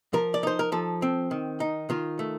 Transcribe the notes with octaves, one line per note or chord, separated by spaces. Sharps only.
F3 A#4
D5
D#4 C5
A#4
F3 A4
C4
D#3
D#4
D#3 F4
A3